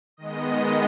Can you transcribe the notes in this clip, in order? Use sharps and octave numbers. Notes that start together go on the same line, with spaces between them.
D#3 G#3 B3 D#5